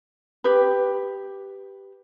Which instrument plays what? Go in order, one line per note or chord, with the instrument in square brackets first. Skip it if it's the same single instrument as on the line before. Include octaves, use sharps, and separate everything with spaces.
[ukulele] G4 B4